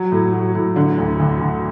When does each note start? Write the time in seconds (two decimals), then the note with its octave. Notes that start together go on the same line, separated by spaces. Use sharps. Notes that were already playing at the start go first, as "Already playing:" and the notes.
Already playing: F#3
0.12 A2
0.33 F#3
0.55 A2
0.76 D3
0.98 D2
1.20 D2
1.41 D2